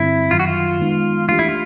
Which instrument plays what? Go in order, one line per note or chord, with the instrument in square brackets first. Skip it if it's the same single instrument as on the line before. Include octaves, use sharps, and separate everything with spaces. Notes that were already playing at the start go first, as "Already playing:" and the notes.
Already playing: [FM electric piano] G2 D3 G3 C4 [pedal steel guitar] E4
[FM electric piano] F#2 D#3 F#3 [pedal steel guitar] F4
[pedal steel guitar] F#4
F4
[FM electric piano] D#3 G#3 B3 D#4
[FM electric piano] E3 A3 D4 G4 [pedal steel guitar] F4
[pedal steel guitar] E4
F4